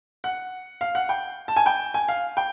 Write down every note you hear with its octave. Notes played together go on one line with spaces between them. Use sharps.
F#5
F5
F#5
G5
A5
G#5
G5
G#5
F5
G5